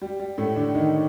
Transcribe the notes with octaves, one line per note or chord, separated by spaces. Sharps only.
G3
G3
A2 A3
D3 D4
D#3 D#4